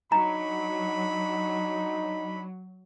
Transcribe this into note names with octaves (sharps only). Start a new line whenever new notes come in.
F#3 D4 D#4 A#5 B5